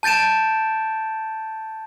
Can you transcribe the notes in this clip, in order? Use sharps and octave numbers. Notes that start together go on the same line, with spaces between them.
A5 G6 A6 D7 E7